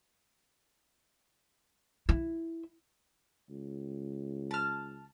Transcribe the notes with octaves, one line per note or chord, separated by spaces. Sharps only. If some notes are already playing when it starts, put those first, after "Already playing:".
E4
C#2
A5 F6